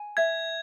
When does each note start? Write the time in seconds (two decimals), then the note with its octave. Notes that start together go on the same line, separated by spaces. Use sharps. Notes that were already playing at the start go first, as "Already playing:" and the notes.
Already playing: G#5
0.17 E5 G#6